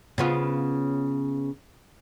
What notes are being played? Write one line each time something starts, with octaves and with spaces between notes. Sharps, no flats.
C#3 B3 F4